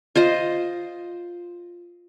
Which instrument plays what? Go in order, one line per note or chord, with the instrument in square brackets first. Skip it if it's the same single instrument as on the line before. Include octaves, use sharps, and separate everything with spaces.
[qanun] F4 C5 D#5